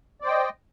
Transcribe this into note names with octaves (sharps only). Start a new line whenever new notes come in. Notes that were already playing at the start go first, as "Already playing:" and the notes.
C5 D5 D#5 G5